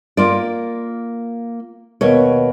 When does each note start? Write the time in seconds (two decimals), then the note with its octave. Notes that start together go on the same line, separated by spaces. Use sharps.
0.17 A#3 F4 D5
2.01 D#2 B2 C#5